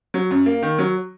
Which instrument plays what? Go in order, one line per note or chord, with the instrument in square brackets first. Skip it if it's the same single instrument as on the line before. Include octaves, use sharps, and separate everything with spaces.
[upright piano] F#3
F#2
A#3
D#3
F#3